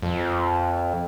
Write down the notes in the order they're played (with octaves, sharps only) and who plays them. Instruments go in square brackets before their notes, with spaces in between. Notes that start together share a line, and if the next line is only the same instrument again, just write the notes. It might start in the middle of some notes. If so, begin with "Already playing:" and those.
[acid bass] F2